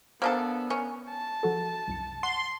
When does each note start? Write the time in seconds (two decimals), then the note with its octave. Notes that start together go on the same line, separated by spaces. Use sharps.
0.22 A#3 B3 D4 A4 C5
0.70 C#4 A#4
1.10 A5
1.43 F3 F#4 A4
1.88 C2 F#2 C#7
2.23 F#5 C6